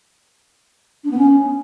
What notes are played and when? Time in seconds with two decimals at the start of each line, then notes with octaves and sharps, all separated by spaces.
1.04 D4
1.11 B3
1.17 C#4